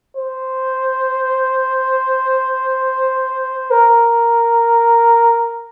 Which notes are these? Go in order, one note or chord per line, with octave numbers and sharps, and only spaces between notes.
C5
A#4